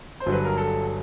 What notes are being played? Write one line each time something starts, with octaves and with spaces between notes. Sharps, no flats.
C5
G1 G2 D3 F#3
B4
A#4
A4